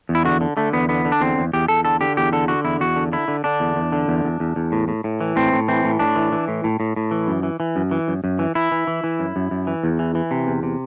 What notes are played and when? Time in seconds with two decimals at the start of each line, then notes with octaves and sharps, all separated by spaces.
0.09 E2
0.15 E4
0.25 D3 F#4
0.41 D3
0.57 D3 A3
0.73 E2 B3
0.89 D3 B3
1.05 D3
1.12 D4
1.20 E2 C4
1.38 E2
1.53 E2 G4
1.68 E2 A4
1.85 D3 A4
2.01 D3 G4
2.17 E2 G4
2.33 D3 A4
2.48 D3 F#4
2.65 E2 E4
2.80 E2 F#4
2.96 D3
3.12 D3 E4
3.28 D3
3.44 D3 D4
3.60 E2
3.76 E2
3.92 D3
4.08 E2
4.24 E2
4.40 E2
4.56 E2
4.72 A2
4.88 A2
5.04 A2
5.21 E3
5.36 A2 C4
5.53 A2
5.68 E3 C4
5.84 A2
5.99 A2 D4
6.16 E3
6.32 E3
6.48 A2
6.64 A2
6.80 A2
6.96 A2
7.11 E3
7.28 F#2
7.43 E3
7.60 E3
7.76 F#2
7.91 E3
8.08 F#2
8.24 F#2
8.39 E3
8.55 E3 E4
8.72 E3
8.87 E3
9.04 E3
9.19 F#2
9.36 F#2
9.51 F#2
9.67 E3
9.84 E2
9.99 E3
10.15 E3
10.31 C3
10.47 E2
10.63 C3